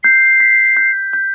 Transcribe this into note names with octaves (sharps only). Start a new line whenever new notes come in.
G6 C7
B6
G6
G6